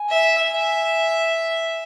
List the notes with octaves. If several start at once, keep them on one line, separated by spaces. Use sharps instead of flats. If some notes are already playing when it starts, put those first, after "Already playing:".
Already playing: G#5
E5
E5